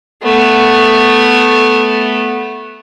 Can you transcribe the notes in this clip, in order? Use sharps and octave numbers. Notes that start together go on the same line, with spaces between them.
A3 B3